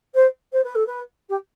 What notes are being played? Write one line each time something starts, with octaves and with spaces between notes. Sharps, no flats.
C5
C5
B4
A4
B4
G4